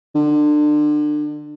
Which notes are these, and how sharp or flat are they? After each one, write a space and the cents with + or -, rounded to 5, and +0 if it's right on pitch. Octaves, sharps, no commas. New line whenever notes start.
D3 +30